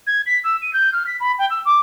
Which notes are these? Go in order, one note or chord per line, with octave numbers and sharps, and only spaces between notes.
G#6
B6
E6
D#7
G6
F6
B6
B5
G5
E6
D6